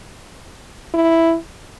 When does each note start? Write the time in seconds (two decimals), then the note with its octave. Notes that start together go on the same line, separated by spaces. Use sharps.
0.94 E4